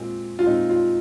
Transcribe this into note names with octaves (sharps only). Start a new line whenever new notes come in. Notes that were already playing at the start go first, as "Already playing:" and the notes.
Already playing: A#2 G#3 C4
F4
A#2 G#3 C4 D#4
F4